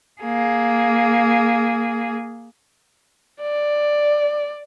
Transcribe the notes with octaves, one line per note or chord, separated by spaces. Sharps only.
A#3 G#4
D5